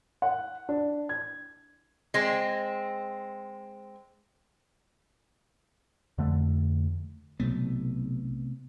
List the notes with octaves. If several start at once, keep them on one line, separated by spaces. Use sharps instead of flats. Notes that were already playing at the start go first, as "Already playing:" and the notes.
F#5
D4
G#6
G#3 C4
F2 D3 A3
B1 C3 A3 B3